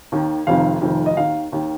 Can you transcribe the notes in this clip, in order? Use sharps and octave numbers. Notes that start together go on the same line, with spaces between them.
D#2 D#3
F1 F2 D#3 F5
F1 F2 D#3
D#5
D#2 D#3 F5
D#2 D#3